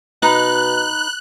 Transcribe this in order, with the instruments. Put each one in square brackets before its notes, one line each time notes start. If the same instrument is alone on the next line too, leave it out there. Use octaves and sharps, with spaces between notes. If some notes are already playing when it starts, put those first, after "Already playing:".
[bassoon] B2 [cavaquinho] D#4 B4 A#5 [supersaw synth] F#6